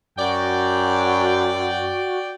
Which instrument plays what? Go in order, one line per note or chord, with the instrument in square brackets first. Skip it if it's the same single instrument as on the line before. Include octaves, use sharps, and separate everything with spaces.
[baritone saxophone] F#2 [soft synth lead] F#4 [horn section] D5 G5